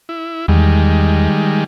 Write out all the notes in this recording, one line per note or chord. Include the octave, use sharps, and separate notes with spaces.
E4
E2 D#3 G3 G#3